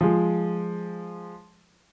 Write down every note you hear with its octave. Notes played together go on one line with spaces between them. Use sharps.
F3 G#3